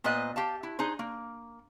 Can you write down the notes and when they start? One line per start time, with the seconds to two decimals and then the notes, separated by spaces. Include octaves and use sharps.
0.04 A#2 B3 B4 C5 D#5
0.36 G4 F5 A5
0.63 E4
0.79 D#4 G#4 C5
0.99 A#3